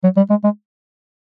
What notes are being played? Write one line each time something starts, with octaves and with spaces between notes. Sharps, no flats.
F#3
G3
G#3
G#3